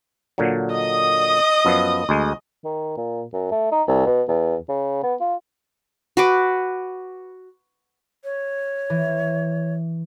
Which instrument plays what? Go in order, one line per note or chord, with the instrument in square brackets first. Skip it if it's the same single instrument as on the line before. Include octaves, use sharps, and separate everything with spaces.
[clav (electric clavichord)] A#2 D3 F#3
[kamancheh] D#5 D#6
[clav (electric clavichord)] F#2 F3 B3
D2 G#3
[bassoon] D#3
A#2
F#2
A3
D#4
C2
B2
E2
C#3
B3
F4
[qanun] F#4 B4 D6
[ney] C#5
[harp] E3